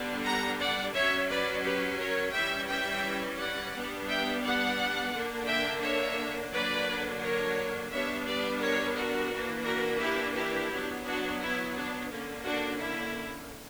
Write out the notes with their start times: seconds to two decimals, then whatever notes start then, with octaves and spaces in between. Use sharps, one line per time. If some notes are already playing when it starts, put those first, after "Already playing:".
Already playing: D3 G3 B3 D4
0.24 F#5 A#5
0.59 D5 F#5
0.94 F#3 C#4 C#5 E5
1.28 B4 D5
1.64 G4 B4
1.99 A#4 C#5
2.34 E3 G3 C#4 E5 G5
2.68 E5 G5
3.38 D5 F#5
3.73 G3 B3 D4
4.08 E5 G5
4.43 D5 F#5
5.13 D3 A#3 D4
5.47 E5 G5
5.82 C#5 E5
6.52 D3 F#3 A#3 D4 B4 D5
7.21 A#4 C#5
7.91 G3 B3 D4 C#5 E5
8.26 B4 D5
8.61 A#4 C#5
8.96 F#4 A#4
9.31 E3 A#3 D4
9.65 F#4 A#4
10.00 E4 G4
10.36 E4 G4
10.71 F#3 B3 D4
11.05 D4 F#4
11.40 E4
11.75 D4
12.10 D3 A#3 C#4
12.44 D4 F#4
12.79 E4